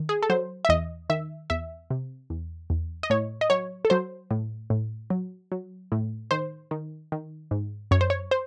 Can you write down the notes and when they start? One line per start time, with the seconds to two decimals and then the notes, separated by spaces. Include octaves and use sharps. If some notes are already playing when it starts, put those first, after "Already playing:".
Already playing: D#3
0.09 G#4
0.23 A4
0.30 F#3 C5
0.65 E5
0.69 E2 D#5
1.10 D#3 E5
1.50 E2 E5
1.90 C3
2.30 E2
2.70 E2
3.03 D#5
3.10 A2 C#5
3.41 D#5
3.50 F#3 C#5
3.85 A4
3.90 F#3 C5
4.31 A2
4.70 A2
5.10 F#3
5.52 F#3
5.92 A2
6.31 D#3 C5
6.71 D#3
7.12 D#3
7.51 G#2
7.91 F#2 C#5
8.01 C5
8.10 C#5
8.31 C5